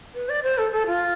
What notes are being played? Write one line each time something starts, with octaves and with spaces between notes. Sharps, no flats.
B4
D5
C5
A4
A4
F4